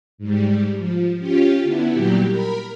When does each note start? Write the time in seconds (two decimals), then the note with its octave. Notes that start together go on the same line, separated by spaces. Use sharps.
0.18 G#2 G3
0.77 F3
1.19 C#4 F4 G4
1.63 D3 B3 E4
1.92 A#2 F#3 G3 G4
2.29 A#4 B5